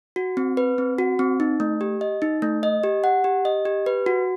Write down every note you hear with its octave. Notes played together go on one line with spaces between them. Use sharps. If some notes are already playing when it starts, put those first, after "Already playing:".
F#4
C4
B4
C4
F#4
C4
D#4
A3
G4
D#5
D#4
A3
D#5
G4
F#5
G4
D#5
G4
B4
F#4